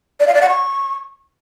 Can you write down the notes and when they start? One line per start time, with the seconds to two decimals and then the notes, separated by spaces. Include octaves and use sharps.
0.20 D5
0.27 F5
0.34 D5
0.42 F#5
0.49 C#6